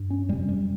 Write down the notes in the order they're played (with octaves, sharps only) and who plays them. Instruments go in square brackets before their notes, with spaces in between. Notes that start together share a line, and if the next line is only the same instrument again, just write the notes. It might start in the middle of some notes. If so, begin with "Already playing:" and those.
Already playing: [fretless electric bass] G2
C#4
F2 C3 G3
G3